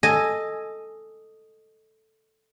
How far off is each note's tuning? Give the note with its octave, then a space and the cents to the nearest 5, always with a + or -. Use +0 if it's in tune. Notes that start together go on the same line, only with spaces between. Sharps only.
A4 +0 D#5 +0 G#5 +0